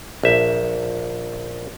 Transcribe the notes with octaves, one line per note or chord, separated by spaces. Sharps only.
A#1 E5